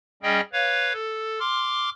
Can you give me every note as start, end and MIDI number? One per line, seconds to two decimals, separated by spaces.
0.23 0.41 55
0.23 0.41 61
0.23 0.41 68
0.23 0.41 75
0.23 0.41 79
0.53 0.93 71
0.53 0.93 73
0.53 0.93 77
0.93 1.39 69
1.40 1.90 84
1.40 1.90 86
1.40 1.90 89